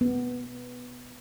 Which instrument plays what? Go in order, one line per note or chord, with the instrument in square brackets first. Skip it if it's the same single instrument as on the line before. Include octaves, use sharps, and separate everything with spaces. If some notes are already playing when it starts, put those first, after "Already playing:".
[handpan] B3